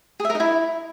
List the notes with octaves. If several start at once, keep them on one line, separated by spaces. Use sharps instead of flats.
G#4
E5
A#4
D#4
E4